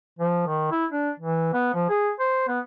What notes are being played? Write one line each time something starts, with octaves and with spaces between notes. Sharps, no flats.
F3
D#3
E4
D4
E3
B3
F3
G#4
C5
B3